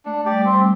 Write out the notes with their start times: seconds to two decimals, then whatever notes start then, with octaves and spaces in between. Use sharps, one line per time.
0.05 A3 D4
0.19 A3
0.25 G4 D5
0.32 G3
0.45 A3 C4
0.53 G3